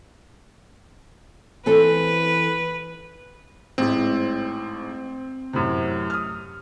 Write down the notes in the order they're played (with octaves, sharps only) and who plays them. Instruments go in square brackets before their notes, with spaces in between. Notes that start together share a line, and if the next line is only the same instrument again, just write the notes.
[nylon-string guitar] E3 C4 A4 [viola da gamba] B4
[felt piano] A1 G#2 E4 [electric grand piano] C4
[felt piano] F#2 A2 C3
D#6 F6